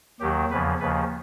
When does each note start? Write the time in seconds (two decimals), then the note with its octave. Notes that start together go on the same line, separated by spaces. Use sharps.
0.20 D#2 D#3 F#3 G4
0.50 E2 C#3 F3 B4
0.80 D#2 C#3 F3 B4